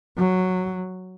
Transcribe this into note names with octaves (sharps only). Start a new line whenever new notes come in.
F#3